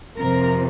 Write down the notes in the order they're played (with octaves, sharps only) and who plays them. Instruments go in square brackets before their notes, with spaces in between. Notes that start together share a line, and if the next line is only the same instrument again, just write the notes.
[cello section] F2 C3 F3 A#4